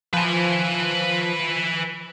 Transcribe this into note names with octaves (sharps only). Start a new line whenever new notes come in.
F3 B4 G#5